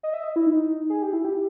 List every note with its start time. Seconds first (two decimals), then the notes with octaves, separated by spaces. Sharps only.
0.03 D#5
0.14 E5
0.24 D#5
0.36 E4
0.46 D#4
0.90 G#4
1.02 G4
1.13 E4
1.25 G4